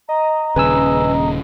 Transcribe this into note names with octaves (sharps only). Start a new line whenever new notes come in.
D#5 A#5
D#1 C#3 B4 G#5 E6